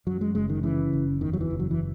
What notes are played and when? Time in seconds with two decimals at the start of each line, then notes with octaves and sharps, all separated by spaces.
0.07 F#2 F#3
0.21 G#3
0.35 F#1 G#3
0.49 D#3
0.63 C#3 E3
0.93 F#1
1.21 E2 D#3
1.33 F#3
1.41 E3
1.51 F#1
1.59 F#3
1.71 E3